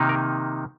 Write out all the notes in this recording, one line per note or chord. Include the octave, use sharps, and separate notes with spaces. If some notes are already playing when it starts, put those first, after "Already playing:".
Already playing: C3 D#3 A#3 D#4
A#4